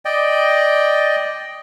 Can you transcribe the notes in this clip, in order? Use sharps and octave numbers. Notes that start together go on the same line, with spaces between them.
D5 D#5 G5